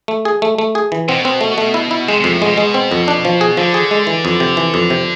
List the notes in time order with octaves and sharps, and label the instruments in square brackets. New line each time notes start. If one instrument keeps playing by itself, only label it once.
[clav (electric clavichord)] A3
G#4
A3
A3
G#4
E3
[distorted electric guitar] B2 [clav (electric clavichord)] C4
[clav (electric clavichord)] C4
A3
A3
E4
E4
[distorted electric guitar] C3 [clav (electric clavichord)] G#3
[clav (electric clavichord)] F2 [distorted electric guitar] C3
[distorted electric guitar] A2
[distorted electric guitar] B2 [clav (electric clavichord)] G#3
[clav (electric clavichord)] G#3
C4
F2
D4
F3
G#4
[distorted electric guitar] D3 [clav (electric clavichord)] F3
[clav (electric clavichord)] G#4
G#3
E3
F2
C3
E3
F2
C3